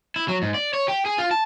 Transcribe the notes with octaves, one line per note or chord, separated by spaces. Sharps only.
E4
F#3
G#2
D5
C#5
G4
G#4
F4
A5